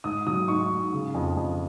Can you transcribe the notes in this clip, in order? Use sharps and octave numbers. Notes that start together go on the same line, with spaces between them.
G#2 D#6
F#3 D#6
G#2 C#6
G#2
C#3
F2
F2